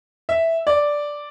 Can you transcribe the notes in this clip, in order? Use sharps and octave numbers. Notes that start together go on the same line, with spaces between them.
E5
D5